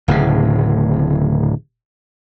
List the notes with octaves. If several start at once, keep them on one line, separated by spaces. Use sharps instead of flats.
D1 A2 C#3